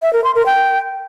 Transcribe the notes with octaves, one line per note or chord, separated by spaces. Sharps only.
E5
A#4
C6
A#4
G5